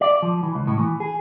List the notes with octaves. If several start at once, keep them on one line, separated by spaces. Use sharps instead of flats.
D5
F3
E3
C#2
A2
E3
G#4